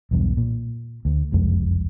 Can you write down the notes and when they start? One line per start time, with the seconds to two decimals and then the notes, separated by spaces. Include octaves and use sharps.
0.11 B1 E2 G2
0.37 A#2
1.05 D2
1.32 F#1 C2 F2 G#3